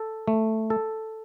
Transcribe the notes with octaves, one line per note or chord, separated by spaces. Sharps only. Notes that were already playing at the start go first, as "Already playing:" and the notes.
Already playing: A4
A3
A4